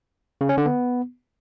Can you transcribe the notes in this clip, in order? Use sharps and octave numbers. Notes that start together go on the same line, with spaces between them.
C#3
C#4
D3
B3